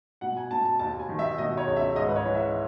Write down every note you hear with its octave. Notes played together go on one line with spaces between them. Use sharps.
B2 F#5
G#5
B2 A5
A5
D#2 A5
G#5
D#3
E5
B2 D#5
C#5
C#2
E5
G#2 D#5
B4
C#5
E3
E5